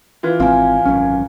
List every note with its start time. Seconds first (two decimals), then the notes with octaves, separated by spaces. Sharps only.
0.23 E3 F4
0.40 G#1 C4 F5 G#5
0.85 G#1 F#2 C#4